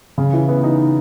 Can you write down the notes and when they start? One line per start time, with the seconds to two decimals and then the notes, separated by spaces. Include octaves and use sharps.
0.18 C#3
0.33 E3
0.49 B3
0.64 D#4